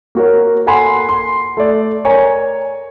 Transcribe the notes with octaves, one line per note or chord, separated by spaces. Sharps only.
A#3 F#4 A#4 C#5
A4 F#5 G#5 B5 C6
C6
A3 D5
A#4 C#5 G#5 A#5